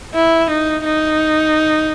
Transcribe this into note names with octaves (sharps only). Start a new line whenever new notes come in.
E4
D#4
D#4